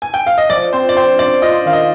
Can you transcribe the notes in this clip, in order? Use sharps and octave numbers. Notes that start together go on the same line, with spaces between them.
G#5
G5
F5
D#5
F3 D5
C4 C5
D5
C4 C5
F3 D5
F4 D#5
D#3 F5
D#5